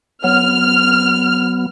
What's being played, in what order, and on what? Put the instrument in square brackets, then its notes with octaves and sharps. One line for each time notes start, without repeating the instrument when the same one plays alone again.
[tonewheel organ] F#3 B3 [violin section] F6